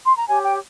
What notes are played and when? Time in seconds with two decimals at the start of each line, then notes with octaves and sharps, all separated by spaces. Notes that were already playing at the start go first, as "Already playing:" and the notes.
0.05 C6
0.16 A#5
0.27 G4 C#5 G#5
0.43 G5